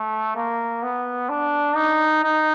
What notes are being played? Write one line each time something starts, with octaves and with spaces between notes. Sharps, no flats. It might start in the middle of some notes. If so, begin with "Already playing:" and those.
Already playing: A3
A#3
B3
D4
D#4
D#4